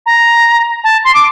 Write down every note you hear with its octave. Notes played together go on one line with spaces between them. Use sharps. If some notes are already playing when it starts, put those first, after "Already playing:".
A#5
A5
C6
D6